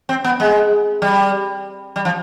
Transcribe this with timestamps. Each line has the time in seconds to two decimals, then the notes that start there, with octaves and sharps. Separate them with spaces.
0.09 C4
0.24 B3
0.40 G#3
1.02 G3
1.96 G3
2.05 F3